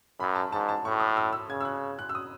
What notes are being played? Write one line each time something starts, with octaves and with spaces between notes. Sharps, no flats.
F#2 B5
A5
G#2 A5
A5
A2 C#6
D#6
E6
E6
C#3 G#6
E6
F#6
F#6
E6
D#6